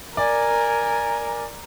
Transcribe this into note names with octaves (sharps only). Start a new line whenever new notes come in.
A#4 D5 G#5